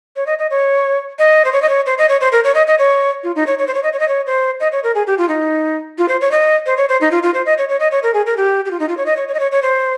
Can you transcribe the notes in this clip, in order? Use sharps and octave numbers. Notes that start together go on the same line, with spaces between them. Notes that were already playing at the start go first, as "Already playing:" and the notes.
C#5
D#5
D#5
C#5
D#5
C5
C#5
D#5
C#5
C5
D#5
C#5
C5
A#4
C#5
D#5
D#5
C#5
F4
D#4
C#5
C#5
C5
C#5
D#5
C#5
D#5
C#5
C5
D#5
C#5
A#4
G#4
G4
F4
D#4
F4
C5
C#5
D#5
C5
C#5
C5
D#4
F4
F4
C5
D#5
C#5
C#5
D#5
C#5
A#4
G#4
A#4
G4
G4
F4
D#4
F4
C#5
D#5
C#5
C#5
D#5
C#5
C#5
C5